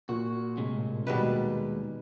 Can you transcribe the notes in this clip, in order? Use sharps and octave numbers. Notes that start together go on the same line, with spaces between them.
A#2 F#4
A2 C3 G#3
D#2 B2 G3 G#3 D#4 B4